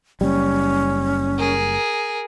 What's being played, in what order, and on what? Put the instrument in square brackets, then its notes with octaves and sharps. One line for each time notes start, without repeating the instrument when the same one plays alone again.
[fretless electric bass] F#1 G3 [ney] C#4
[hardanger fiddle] G#4 A#4